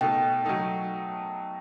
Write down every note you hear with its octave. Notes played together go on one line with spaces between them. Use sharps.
B2 A3 D#4 A4 G5
F#3 A3 D#4 A4